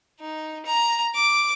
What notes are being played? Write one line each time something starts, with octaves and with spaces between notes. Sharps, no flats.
D#4
A#5
D6